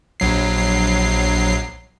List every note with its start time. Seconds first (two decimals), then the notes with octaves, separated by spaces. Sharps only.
0.20 A#1 F#3 C7